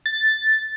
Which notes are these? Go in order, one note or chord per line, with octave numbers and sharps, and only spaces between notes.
A6